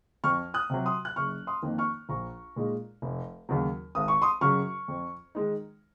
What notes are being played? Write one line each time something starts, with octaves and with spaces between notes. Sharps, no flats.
F2 C#6 F6
D#6 F#6
C3 F#3
C6 D#6
F#6
F#1 C#6 F6
C6 D#6
F2 D#3 A#3
C#6 F6
A#1 A#5 C#6
A#2 G#3 D#4
F1
D#2 C#3 F#3
G#1 D#6
C#6
C6 D#6
F#2 C#3 F#3 C#6 F6
F2
D#3 G#3 D#4